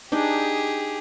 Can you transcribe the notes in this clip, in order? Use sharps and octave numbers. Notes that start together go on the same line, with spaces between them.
D4 D#4 G4 G#4 D5